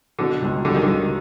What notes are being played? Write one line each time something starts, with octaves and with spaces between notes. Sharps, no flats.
B2 D3
C#2
D3 G3
D#3
C#2 D3